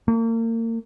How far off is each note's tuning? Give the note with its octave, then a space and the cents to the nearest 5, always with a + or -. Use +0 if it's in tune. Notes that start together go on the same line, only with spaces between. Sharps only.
A#3 -35